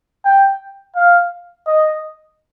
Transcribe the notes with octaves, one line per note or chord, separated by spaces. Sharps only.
G5
F5
D#5